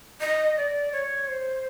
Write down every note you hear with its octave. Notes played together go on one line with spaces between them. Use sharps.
D#5
D5
C#5
C5